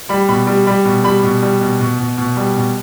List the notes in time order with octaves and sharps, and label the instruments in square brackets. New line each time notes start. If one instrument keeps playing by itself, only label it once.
[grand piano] G3 B5
B2 B5
G3
G3 B5
B2
G3 B5
B2
G3
B2
B2
B2
B2
G3
B2